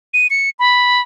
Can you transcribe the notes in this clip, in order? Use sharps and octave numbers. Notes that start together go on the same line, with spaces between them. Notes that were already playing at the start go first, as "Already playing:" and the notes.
D#7
C#7
B5